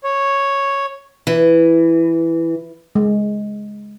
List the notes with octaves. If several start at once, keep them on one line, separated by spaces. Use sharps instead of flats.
C#5
E3
G#3